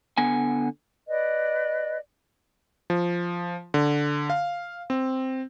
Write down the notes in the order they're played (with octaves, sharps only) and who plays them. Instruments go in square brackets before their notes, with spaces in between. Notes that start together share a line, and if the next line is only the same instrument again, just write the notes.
[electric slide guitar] D3 B3 G#5
[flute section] B4 D5 D#5
[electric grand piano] F3
D3
F5
C4